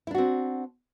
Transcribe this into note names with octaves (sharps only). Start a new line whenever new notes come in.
C4 D4 E4 F#4